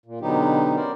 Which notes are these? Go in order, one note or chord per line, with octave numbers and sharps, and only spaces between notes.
A#2
B2 D3 F#3 B3 D#4 G4
C#4 A#4 C5 D5